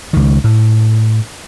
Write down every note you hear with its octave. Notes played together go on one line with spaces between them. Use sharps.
C#2 D#3
A2